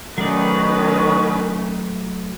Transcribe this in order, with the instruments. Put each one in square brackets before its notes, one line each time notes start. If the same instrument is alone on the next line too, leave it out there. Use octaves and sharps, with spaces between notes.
[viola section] D#3 B4 [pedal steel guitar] F#3 A3 D5 [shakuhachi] C#4